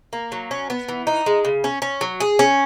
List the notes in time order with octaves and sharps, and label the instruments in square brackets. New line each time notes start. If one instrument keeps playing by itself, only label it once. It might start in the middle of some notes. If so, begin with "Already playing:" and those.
[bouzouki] A#3
F#3
C#4
B3
E3
D#4
G#3
C#3
C#4
C#4
F#3
G#4
C#4